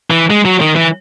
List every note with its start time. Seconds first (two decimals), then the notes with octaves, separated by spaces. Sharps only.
0.10 E3
0.30 G#3
0.45 F#3
0.60 D#3
0.76 E3